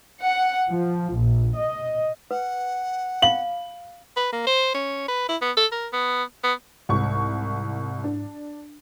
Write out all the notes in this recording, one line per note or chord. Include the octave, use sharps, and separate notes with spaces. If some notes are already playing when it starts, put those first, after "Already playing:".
F#5
F3
A#1
D#5
B4 F#5
F5 B5 F#7
B4
A#3
C5
C#4
B4
E4
B3
A4
A#4
B3
B3
C2 G#2 C#6
D4